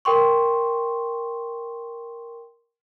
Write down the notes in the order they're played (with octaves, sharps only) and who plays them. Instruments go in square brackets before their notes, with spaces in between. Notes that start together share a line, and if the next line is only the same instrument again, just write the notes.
[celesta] A#4 G5 C6 C#6